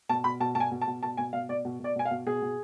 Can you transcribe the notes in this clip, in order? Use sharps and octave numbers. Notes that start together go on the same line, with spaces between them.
B2 A5
B2 B5
B2 A5
B2 A5
G#5
B2
A5
B2
B2 A5
B2 G#5
B2 F5
B2 D5
B2
B2 D5
B2 G#5
F5
B2
B2 G#4
B2